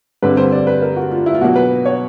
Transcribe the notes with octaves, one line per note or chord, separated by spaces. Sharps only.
G2 D3 G3 C4 B4
C5
D5
B4
A#4
F#4
F4
E4
F4
B2 F#3 A#3 F#4
B4
C#5